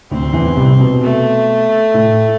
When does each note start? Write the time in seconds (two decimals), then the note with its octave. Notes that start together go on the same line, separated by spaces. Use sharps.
0.11 D2 D3 C4
0.33 E2 E3
0.56 C2 C3
0.79 B2
1.01 A3
1.94 A2